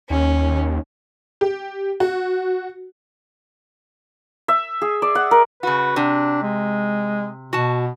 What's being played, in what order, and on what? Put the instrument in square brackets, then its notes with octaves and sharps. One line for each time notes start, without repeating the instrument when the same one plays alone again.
[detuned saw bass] D#2 [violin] C#4
[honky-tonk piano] G4
F#4
[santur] E5
G#4
D5
F#5
A#4
[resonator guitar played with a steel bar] C#3 F#4 [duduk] B4
[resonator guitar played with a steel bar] C3 [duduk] D4
[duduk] G#3
[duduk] B2 [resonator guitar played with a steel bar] F#4 A5